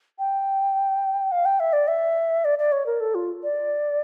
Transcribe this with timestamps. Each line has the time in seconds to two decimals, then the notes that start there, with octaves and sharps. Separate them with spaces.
0.19 G5
1.32 F5
1.45 G5
1.60 E5
1.73 D5
1.88 E5
2.45 D5
2.59 D5
2.72 C#5
2.86 A#4
3.00 A4
3.15 F4
3.43 D5